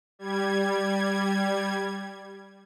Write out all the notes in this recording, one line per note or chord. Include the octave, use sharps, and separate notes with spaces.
G3 G#6